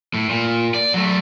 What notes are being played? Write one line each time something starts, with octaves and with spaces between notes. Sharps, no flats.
A2
A#2
D5
F#3 A3